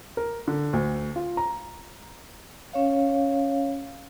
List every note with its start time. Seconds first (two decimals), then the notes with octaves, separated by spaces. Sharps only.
0.17 A#4
0.48 D3
0.73 D2
1.16 F4
1.37 A#5
2.73 C#4 C#5 F5